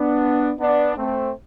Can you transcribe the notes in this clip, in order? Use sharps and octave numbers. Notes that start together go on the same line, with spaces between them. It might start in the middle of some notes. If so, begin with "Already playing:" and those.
Already playing: B3 D4
B3 D4
A3 C4